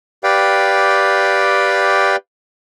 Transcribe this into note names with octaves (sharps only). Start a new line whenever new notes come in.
G4 B4 D5 F5 G5